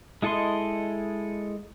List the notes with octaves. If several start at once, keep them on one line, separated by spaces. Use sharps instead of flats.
G#3 E4 A4 D#5 C6